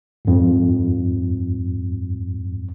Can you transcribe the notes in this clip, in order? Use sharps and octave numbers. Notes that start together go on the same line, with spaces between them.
F2 G#2